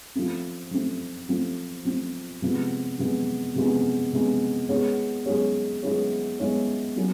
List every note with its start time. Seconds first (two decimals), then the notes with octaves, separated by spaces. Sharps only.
0.15 F3 A3 C4
0.71 F3 A3 C4
1.29 F3 A3 C4
1.85 F3 A3 C4
2.42 C3 F3 G#3 B3
2.99 C3 F3 G#3 B3
3.55 C3 F3 G#3 B3
4.13 C3 F3 G#3 B3
4.69 G#3 B3 E4 G#4 C#5
5.26 G#3 B3 E4 G#4 C#5
5.83 G#3 B3 E4 G#4 C#5
6.40 G#3 B3 E4 G#4 C#5
6.96 F#3 A#3 C#4 E4 A4